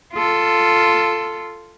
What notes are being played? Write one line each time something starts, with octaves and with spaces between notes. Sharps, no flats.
F4 A4